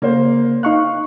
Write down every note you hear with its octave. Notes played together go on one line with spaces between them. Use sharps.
C#3 A#3 C5
D#4 F5 C#6 F#6